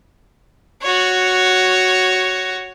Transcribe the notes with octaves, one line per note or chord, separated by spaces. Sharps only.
F#4 C#5